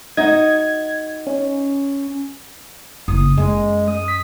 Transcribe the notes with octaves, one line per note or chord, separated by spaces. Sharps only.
D#4 F#4 D#5 G#6
C#4
F#1 D#6
F#2 G#3
D#6
B6